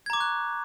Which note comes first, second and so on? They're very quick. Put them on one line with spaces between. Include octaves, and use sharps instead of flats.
G#6 A#5 D6 C#6 F#6